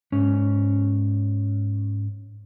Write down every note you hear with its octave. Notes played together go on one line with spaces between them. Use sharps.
G#2 C#4